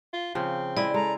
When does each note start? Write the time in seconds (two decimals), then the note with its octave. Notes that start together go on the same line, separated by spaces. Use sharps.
0.14 F4
0.35 C#3 F3 C4
0.77 G#3 E4 D5 D#5
0.94 G#3 A4 A#5